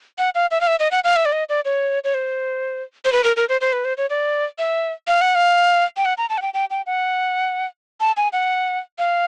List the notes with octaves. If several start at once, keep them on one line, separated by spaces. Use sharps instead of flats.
F#5
F5
E5
F5
E5
D#5
F#5
F5
E5
D5
D#5
D5
C#5
C#5
C5
C5
B4
A#4
A#4
C5
C5
B4
C5
C#5
D5
E5
F5
F#5
F5
G5
F#5
A#5
A5
F#5
G5
G5
G5
F#5
A5
G#5
F#5
F5